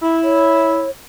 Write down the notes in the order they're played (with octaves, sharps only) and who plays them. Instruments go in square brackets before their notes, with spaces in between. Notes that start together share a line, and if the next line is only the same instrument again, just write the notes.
[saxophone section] E4
[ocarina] C#5